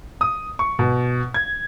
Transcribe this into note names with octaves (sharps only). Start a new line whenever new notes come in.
D#6
C#6
B2
G#6